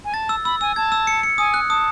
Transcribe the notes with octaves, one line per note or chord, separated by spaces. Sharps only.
G#5
A5 A6
E6
B5 E6
G#5 E6
A5 G#6
E6
C#7
C#7
G#5 D#6
F#6
A5 D#6